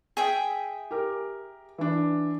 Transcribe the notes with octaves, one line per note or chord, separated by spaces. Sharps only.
G#4 E5 G5
G4 A#4
E3 D4